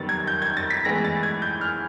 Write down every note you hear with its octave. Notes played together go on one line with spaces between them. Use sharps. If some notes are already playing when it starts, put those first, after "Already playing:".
Already playing: F#2 D#3 G3 B3 A6
G#6
G6
G#6
A6
B6
A2 E3 G#3 B3 A#6
A6
G#6
G6
F6